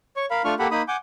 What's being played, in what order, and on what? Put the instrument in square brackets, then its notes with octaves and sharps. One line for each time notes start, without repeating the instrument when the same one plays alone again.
[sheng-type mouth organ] C#5 C#6
A#4 F5 B5
A3 D4 F4 C#6 F6
A#3 G4 A4 F#5 B5
A#3 D#4 B5 D#6
F#5 G#5 D6 G6